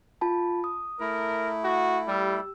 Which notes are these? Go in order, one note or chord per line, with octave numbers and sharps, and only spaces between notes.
F4 A5 B5
D#6
A3 E4 A#4
F#4
G3 G4 E6